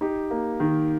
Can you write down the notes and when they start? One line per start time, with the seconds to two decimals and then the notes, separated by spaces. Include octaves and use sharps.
0.01 D#4 G4
0.31 A#3
0.60 D#3